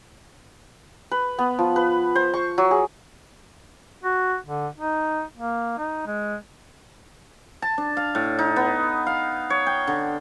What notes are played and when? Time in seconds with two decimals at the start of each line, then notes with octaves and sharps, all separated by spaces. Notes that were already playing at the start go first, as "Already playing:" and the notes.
1.11 B4
1.39 B3
1.59 F3
1.76 B4
2.15 C5
2.34 C#6
2.58 F#3
2.71 G#4
4.03 F#4
4.46 D3
4.76 D#4
5.37 A#3
5.78 D#4
6.06 G#3
7.62 A5
7.78 D4
7.97 F5
8.15 A2
8.39 D#4
8.56 B3
9.06 F5
9.50 C#5
9.67 G5
9.87 D3